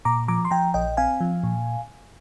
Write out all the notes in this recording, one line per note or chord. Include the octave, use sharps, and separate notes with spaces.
A#2 A#5 D6
F3 A#5 D6
C6
F3 G5 A#5
A#1 D#5 G5
C4 F5 G#5
F3
A#2